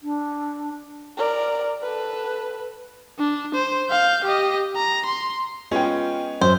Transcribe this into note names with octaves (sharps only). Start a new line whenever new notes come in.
D4
A#4 D5
A4 B4
D4
C5
F5 G6
G4 D#5
A#5
C6
G#3 B3 C#4 F4 G5
F#2 C5